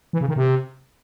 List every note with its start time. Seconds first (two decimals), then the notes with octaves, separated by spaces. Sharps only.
0.13 E3
0.21 C#3
0.29 D#3
0.36 C3